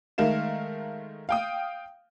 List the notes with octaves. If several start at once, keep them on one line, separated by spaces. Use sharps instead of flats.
D#3 G#3 A3 A#4 F5 E7
F5 G5 D#6